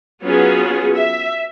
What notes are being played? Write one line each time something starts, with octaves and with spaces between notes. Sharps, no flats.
F#3 B3 C#4 F4 G#4
E5